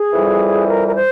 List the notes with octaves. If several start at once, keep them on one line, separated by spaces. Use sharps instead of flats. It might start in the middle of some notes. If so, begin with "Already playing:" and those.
Already playing: G#4
F2 E3 G3
A#4
A#4
C5